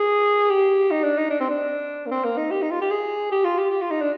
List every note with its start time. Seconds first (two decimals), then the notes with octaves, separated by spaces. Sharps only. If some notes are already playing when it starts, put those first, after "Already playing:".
Already playing: G#4
0.51 G4
0.91 D#4
1.04 D4
1.18 D#4
1.30 D4
1.41 C4
1.50 D4
2.06 A#3
2.12 C4
2.25 A#3
2.38 D#4
2.51 G4
2.62 D#4
2.71 F4
2.82 G4
2.91 G#4
3.32 G4
3.45 F4
3.58 G4
3.71 G4
3.82 F4
3.91 D#4
4.02 D4